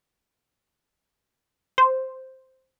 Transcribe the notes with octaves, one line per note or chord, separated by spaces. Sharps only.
C5